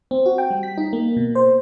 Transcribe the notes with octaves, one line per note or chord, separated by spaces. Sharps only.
C4
F#4
G5
G3
B6
D#4
A#3
B2
C5